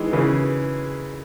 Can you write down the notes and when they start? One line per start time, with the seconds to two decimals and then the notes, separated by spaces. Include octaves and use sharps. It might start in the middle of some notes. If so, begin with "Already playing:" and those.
Already playing: D#3 E3 G#3
0.13 C#3 E3